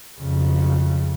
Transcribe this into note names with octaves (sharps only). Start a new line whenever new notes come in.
F2 C#3